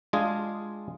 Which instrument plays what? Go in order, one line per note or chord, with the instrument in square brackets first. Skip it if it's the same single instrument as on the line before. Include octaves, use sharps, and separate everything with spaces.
[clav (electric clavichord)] G#3 D4 F4 G#4